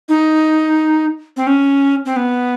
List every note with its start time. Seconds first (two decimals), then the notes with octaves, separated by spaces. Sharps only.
0.09 D#4
1.37 C4
1.47 C#4
2.06 C4
2.16 B3